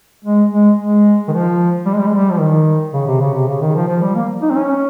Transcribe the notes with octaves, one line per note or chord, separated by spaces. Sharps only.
G#3
G#3
G#3
D#3
F3
G3
G#3
G3
G#3
G3
F3
D#3
C#3
C3
C#3
C3
C#3
D#3
F3
F3
G3
A#3
D#4
C4
C#4